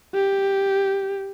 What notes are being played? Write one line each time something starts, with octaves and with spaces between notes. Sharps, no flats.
G4